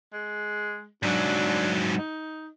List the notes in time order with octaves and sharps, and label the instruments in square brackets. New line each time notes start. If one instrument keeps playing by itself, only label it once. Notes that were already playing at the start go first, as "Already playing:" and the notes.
[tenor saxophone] G#3
[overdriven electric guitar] G#2 F#3 [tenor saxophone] D4
[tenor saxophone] D#4